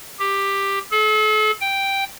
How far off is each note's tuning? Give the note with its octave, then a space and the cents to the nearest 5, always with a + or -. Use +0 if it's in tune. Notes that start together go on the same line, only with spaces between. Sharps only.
G4 +10
A4 -40
G5 +0